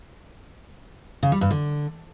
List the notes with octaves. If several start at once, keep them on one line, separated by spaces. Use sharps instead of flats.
C#3
G3
G2
D3